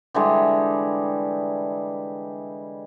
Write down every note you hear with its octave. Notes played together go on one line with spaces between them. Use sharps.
D3 E3 G3 G#3